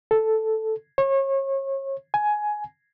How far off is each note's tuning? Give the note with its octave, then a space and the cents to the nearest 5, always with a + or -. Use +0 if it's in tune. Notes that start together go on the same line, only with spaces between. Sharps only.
A4 +0
C#5 -30
G#5 +15